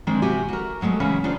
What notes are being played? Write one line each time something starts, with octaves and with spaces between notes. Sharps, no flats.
D#3 E3 G#3 C4 D4
C3 F#4 G4 E5 G#5
F#4 A#4
F3 F#3 G#3 A3 B3
C#3 E3 A#3 C#4 E5 F#5
D4 D#4 F4 A4 C5